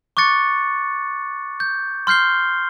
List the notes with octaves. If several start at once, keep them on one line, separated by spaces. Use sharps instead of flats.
C#6 D6 F#6 A6 C#7
G6
C6 F6 G6 C7 G7